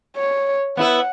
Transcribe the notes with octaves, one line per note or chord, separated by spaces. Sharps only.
C#5
B3 E4 B4 F#5